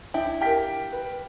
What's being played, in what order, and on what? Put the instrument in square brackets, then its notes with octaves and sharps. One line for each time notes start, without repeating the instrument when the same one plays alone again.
[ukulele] D4 [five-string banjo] E4 [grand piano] G5
[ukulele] G4 A#4 [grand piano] F5 G5 B6
[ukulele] B4